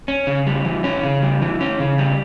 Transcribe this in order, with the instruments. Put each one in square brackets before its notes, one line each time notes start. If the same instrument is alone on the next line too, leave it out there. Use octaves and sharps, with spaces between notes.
[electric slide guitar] C#4
C#3
G3
E3
C#4
C#3
G3
E3
C#4
C#3
G3